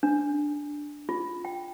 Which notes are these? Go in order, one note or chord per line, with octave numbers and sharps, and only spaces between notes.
D4
F4
G5